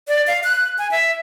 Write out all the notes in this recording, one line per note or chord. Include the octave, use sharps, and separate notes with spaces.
D5
F5
F#6
G#5
E5